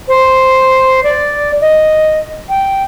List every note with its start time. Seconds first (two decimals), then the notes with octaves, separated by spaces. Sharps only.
0.08 C5
1.04 D5
1.61 D#5
2.49 G5